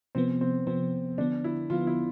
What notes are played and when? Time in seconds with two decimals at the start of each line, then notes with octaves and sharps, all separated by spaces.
0.15 C3 F3 B3 C4
0.41 C4
0.67 C3 F3 B3 C4
1.18 D3 F3 B3 D4
1.44 E4
1.70 D3 F3 B3 F4
1.87 E4